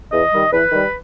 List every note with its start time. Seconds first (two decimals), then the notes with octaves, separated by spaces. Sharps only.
0.12 E2 D#5
0.32 D#3 G3
0.52 E2 B4
0.71 D#3 G3